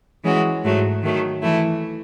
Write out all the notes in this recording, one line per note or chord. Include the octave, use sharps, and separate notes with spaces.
E3 G#3 C#4 F#4
G#2 F#3 A3
D#3 F#3 A3
E3 A3 E4